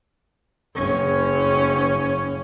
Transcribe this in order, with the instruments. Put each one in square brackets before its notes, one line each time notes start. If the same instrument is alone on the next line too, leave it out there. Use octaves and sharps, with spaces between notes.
[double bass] F#1 C#4